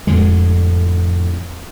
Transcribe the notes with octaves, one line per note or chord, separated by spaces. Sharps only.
F1 F2 A2 D3 G#3